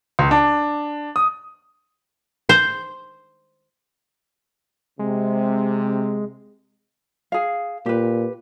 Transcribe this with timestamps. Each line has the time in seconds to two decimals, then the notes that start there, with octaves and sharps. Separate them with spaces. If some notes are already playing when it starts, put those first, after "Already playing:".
0.19 C#2
0.31 D4
1.16 D#6
2.49 C5
4.99 C3 G#3
7.32 G#4 F5
7.86 A#2 G4 B4